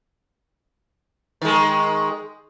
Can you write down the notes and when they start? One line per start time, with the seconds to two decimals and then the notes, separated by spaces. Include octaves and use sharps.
1.42 D#3 G#3